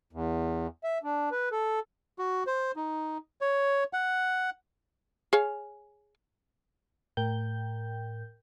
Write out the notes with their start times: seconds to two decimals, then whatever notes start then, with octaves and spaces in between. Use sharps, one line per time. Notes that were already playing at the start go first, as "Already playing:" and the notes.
0.13 E2
0.84 E5
1.03 D4
1.32 B4
1.52 A4
2.19 F#4
2.47 C5
2.76 D#4
3.41 C#5
3.93 F#5
5.33 G#4 C#5 F5
7.17 A2 A#4 G5 G6